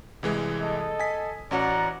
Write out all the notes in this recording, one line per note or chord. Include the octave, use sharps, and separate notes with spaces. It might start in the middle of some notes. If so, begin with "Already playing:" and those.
C2 E3 G#3
A4 D#5
G#5 B6
A1 C#4 F#4 D5 F#5 A#5